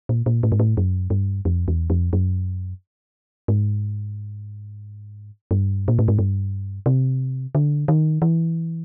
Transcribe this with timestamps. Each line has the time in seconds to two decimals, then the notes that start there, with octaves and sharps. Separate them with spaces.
0.09 A#2
0.26 A#2
0.43 A2
0.52 G#2
0.60 A2
0.77 F#2
1.10 G2
1.45 F2
1.68 E2
1.90 F2
2.13 F#2
3.48 G#2
5.51 G2
5.88 A#2
5.99 A2
6.08 G#2
6.19 G2
6.86 C3
7.55 D3
7.88 D#3
8.22 E3